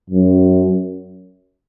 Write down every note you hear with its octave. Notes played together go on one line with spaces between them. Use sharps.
F#2